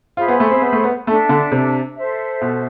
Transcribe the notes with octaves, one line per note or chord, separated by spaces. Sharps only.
F4 G#4 C5 E5 B5
B3
A3
C4
B3
A3
B3
A3 D4 A4 E5 A5
D3
C3
A4 C5 E5
B2